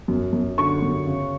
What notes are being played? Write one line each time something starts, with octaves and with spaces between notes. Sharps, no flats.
F#2
F#2
D3 C#6
F#2
C#3